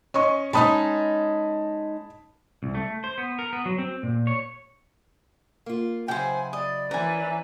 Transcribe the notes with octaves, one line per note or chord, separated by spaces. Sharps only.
C#4 D#5 C#6
G#3 C#4 D#4 A5 B5 D#6
C2
A3
C5
B3
A#4
B3
F#3
C4
A#2
C#5
A#3 F4
C#3 F#3 E4 C5 G5 G#5
D5 D#5
E3 C#4 A#4 B4 G#5